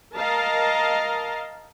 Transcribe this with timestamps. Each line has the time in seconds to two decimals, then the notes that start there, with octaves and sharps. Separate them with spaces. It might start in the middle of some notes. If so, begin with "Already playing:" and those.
0.14 A#4 D#5 F5 A5 A#5